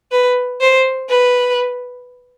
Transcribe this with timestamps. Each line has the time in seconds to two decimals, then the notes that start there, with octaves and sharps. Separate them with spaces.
0.11 B4
0.60 C5
1.09 B4